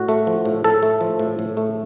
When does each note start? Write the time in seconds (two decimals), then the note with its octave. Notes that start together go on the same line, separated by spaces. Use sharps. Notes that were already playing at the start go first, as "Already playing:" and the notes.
Already playing: A2 F#4
0.09 A3
0.27 F3
0.45 A2
0.64 A2 A4
0.83 A3
1.01 F3
1.19 A2
1.39 A2
1.57 A3